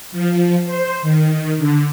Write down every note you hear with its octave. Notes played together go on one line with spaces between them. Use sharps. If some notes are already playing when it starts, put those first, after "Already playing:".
F3
C5
D#3
D3